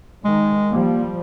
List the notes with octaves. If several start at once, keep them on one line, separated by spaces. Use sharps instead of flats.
D#3 G#3
F3 G3 A#3